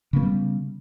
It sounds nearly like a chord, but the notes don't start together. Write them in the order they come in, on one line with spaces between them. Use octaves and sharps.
C#3 A#3 B3 G3